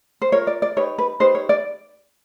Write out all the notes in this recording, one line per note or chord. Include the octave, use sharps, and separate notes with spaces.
C5
F4 A#4 C#5
D5
D5
D#4 G4 B4 C#5
B4
D#4 G4 B4 C5
C#5
D5